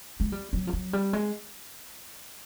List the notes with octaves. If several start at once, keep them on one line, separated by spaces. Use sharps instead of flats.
G#3
G3
F#3
F3
F#3
G3
G#3